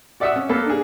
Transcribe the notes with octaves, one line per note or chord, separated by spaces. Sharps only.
F#4 D5 E5 F#5 D#6 E6
C#4
A#3 B3 A4
D4 G#4